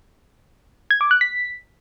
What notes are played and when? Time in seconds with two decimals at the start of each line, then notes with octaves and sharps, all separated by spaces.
0.91 G#6
1.01 D6
1.11 F#6
1.21 B6